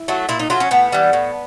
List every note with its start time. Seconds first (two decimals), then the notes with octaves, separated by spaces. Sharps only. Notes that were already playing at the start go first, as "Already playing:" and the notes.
Already playing: E4
0.08 F#3 A3
0.29 A#2 E4
0.39 D#4
0.50 F#3 A3 F4
0.60 C#4
0.71 A2 B3
0.92 E3 G3
1.13 A2